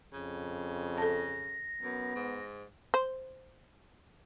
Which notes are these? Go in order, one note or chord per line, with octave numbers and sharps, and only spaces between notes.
F2 C#3
A4 A5 A#6
F#2 B3
G#2
C5